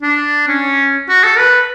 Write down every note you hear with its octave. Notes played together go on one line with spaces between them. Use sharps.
D4
C#4
F#4
A4
B4